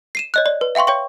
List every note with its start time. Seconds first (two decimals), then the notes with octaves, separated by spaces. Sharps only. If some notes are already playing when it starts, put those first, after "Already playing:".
0.15 C7 D#7 E7
0.34 C#5 D#5 F#6
0.46 D5
0.61 B4
0.75 E5 F5 G5 C6 C#6
0.87 C#5 G5 C#6